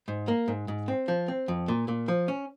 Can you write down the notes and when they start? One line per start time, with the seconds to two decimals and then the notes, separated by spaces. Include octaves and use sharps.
0.08 G#2
0.28 A#3
0.48 G#2
0.68 G#2
0.88 C4
1.08 F3
1.28 C4
1.48 F2
1.68 A#2
1.88 A#2
2.08 F3
2.28 C#4